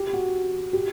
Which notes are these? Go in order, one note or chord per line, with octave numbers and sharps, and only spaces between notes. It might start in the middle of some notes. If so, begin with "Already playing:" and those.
Already playing: G4
F#4
G4